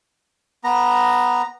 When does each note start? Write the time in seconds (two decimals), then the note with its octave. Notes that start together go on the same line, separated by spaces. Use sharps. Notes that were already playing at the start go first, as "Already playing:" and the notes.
0.64 B3 A#5